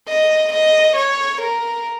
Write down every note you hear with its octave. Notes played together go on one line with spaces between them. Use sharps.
D#5
D#5
C#5
A#4